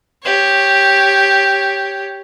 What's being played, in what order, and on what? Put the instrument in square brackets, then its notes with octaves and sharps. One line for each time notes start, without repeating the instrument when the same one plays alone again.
[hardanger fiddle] G4 C#5